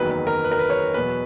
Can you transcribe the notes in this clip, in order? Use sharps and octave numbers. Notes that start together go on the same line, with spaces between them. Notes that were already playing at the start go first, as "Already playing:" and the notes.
Already playing: F#1 E2 D#3 F#3 B4
B4
A#4
B4
A#4
B4
C#5
E2 B2 F#3 B4